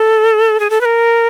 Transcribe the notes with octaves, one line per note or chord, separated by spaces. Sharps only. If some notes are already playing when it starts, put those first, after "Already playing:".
Already playing: A4
G#4
A4
B4
A#4